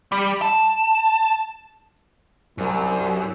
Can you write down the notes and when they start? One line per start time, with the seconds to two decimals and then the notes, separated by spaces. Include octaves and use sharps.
0.12 G3
0.42 A5
2.58 C2 F#2